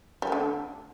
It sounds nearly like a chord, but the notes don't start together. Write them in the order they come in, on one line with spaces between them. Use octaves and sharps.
G3 A3 D3